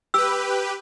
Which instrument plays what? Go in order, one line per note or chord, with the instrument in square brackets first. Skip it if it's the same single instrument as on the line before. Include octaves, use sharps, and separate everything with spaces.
[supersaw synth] G4 B4 [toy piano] E6